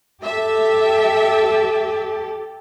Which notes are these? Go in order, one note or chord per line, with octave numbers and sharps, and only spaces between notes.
G4 A4 E5